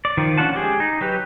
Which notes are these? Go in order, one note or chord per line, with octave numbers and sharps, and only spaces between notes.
D5
D#3 F3
C#4 D4 F4 F#5 A5
G#3 G4 G#4
D#4
F#3 G4 B4